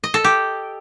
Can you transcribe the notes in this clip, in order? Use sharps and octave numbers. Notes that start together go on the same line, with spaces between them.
D#5
A4
G4